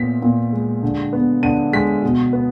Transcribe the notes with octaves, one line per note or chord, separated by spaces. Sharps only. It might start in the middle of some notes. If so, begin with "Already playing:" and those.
Already playing: A#2 B3 B6
A#2
G#3
D3
B3
D3 D#7
G#3 B6
B2
B3